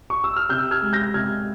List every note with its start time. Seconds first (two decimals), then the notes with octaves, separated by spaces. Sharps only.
0.10 C#6
0.24 E6
0.36 F6
0.49 C3 E6 G6
0.71 F6 G#6
0.83 G#3
0.93 G6 A#6
1.14 C3 F6 G#6